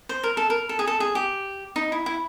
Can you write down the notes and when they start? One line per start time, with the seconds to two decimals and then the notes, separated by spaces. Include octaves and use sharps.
0.09 C5
0.23 A#4
0.37 A4
0.50 A#4
0.69 A4
0.79 G#4
0.87 A4
1.00 G#4
1.15 G4
1.76 D#4
1.92 E4
2.06 E4